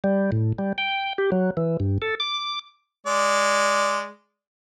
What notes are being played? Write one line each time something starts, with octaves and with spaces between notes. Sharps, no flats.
G3
A2
G3
G5
G4
F#3
E3
G2
A4
D6
G#3 D5